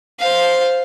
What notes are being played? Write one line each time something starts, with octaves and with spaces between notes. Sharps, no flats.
C5 F5